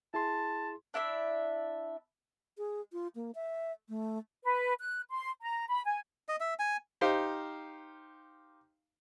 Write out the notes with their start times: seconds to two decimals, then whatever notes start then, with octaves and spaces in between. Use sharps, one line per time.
0.14 E4 G#4 A5 C6
0.94 D4 E4 D5 E5
2.58 G#4
2.93 F4
3.15 A#3
3.35 E5
3.89 A3
4.43 B4
4.79 F#6
5.10 C6
5.41 A#5
5.68 B5
5.84 G#5
6.29 D#5
6.40 E5
6.59 G#5
7.01 D#4 G4 C5 F5